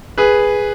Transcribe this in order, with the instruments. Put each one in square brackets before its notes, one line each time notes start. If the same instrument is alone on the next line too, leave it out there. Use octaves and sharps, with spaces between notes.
[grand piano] G#4 B4